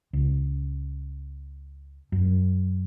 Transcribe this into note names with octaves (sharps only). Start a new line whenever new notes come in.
C#2
F#2